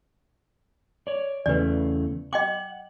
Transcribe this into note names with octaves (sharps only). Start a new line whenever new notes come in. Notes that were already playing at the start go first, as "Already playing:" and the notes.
C#5 D5
E2 C#3 A3 B4 D5
D#5 F#5 G5 D6